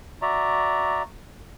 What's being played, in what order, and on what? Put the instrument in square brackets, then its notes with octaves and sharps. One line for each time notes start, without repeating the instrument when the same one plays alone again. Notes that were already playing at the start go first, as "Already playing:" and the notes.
[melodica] F#4 D5 E5 A#5